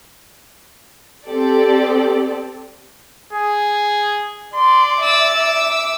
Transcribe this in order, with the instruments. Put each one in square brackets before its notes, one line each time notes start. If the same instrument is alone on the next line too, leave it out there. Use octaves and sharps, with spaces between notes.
[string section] C4 G4 A4 D5
[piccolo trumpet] G#4
[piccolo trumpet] D5 [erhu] C6
[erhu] E5 [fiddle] D6 E6